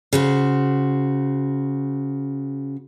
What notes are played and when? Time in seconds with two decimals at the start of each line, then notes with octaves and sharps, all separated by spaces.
0.13 C#3 F#4 C5